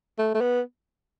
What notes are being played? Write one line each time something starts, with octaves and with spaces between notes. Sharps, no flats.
A3
A3
B3